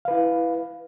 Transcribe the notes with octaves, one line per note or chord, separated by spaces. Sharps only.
E4 B4 F5